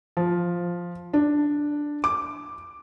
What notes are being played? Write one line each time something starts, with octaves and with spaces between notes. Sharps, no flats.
F3
D4
D6